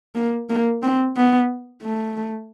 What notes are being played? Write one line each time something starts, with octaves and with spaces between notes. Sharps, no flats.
A#3
A#3
C4
B3
A3